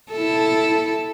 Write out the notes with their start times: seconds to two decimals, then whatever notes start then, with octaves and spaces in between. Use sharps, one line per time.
0.12 E4 A4